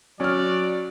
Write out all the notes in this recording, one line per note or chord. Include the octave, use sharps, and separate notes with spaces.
F#3 C#4 D5 F6